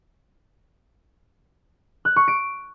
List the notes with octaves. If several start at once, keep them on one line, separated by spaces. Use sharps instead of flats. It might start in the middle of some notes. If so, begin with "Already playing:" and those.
F#6
C#6
D7